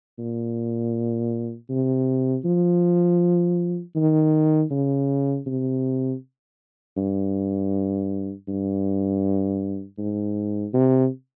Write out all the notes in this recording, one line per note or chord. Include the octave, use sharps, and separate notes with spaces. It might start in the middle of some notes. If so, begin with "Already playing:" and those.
A#2
C3
F3
D#3
C#3
C3
G2
G2
G#2
C3